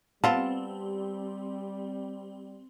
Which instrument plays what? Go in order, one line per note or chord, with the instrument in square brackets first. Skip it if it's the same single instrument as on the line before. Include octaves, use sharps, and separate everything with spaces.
[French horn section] G3 [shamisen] B3 F4 [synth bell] C4 [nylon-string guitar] A5